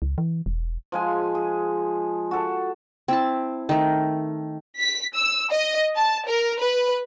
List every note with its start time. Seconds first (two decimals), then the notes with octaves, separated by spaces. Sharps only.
0.02 C#2
0.18 E3
0.46 E1
0.92 F3 G#3 G#5
1.35 G#4
2.31 F#4 A4
3.08 C4 E4 A5
3.69 D#3 A3
4.79 B6
5.15 E6
5.50 D#5
5.97 A5
6.29 A#4
6.61 B4